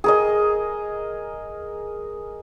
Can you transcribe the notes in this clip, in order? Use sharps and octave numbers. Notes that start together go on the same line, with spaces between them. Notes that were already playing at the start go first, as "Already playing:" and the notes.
G#4 A#4 D#5